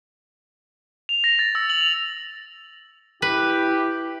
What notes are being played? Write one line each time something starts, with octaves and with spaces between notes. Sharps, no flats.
F7
A#6
A6
E6
F#7
F7
E4 G4 B4